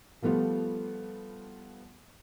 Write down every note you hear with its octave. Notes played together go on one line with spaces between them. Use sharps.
F3 G3 A3 B3 F4